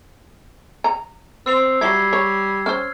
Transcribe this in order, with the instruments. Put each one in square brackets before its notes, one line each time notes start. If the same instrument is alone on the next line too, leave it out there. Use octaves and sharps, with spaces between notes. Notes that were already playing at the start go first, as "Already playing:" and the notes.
[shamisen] A#5
[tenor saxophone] C4 [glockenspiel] E6 C7 F7
[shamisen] F#3 E4 [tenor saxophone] G3 [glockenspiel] G#6 C7 G7
[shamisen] C#5
[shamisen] C#4 C5 [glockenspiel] F6